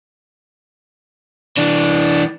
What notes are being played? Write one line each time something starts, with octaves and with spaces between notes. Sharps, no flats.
E3 D4